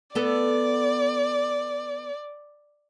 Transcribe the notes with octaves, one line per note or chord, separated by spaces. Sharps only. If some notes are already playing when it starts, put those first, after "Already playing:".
B3 A4 D5